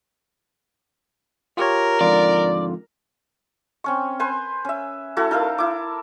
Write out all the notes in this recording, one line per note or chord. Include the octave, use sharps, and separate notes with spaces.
F4 G4 A#4 C#5
F2 G#2 D3 F4 D5
C4 C#4 C#6
B4 C5 G#5
C#4 E5
A3 E4 F#4 A4
D#4 A4 A#4 F5
E4 D6